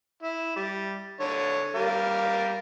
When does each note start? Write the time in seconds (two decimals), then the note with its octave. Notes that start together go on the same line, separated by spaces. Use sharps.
0.22 E4
0.56 G3
1.20 D3 C#5
1.75 G3 A#4 F5